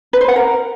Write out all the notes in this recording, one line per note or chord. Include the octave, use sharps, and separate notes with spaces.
B4
C5
F#5
A#4